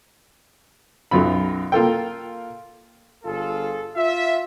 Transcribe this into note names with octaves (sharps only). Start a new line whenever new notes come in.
B1 F#2 F#3 F4 B5
A#3 F4 A4 G5
G1 F4 G#4 A4
F4 E5